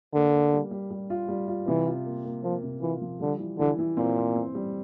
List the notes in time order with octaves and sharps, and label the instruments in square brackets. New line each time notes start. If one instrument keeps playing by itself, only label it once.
[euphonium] D3 [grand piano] A#3
[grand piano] A#3
G3
G3
G3
F4
G3
F4
[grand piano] C3 [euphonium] E3
[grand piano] F4
A#3
A#3
[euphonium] F3 [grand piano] A#3
[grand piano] C3
[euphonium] E3 [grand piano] F4
[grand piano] F3
[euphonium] D3 [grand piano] G3
[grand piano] E3
[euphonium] D3 [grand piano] E3
[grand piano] E3
[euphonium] A#2 [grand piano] C4
[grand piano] C4
C4
G3